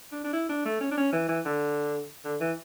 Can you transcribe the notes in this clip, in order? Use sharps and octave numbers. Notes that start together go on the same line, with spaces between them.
D4
D4
E4
D4
A3
C#4
D4
C#4
E3
E3
D3
D3
E3